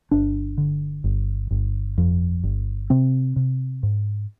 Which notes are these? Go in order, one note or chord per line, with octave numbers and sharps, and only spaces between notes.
G1 D4
D3
G1
G1
F2
G1
C3 C4
C3
G#2